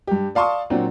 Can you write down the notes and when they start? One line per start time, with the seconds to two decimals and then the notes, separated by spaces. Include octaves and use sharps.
0.07 G2 G4
0.35 D5 F5 A5 C6 C#6 D#6
0.70 A#2 F#3 C4 D4 F#4